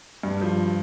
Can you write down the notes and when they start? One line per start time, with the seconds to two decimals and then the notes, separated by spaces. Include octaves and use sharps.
0.23 G2
0.41 F3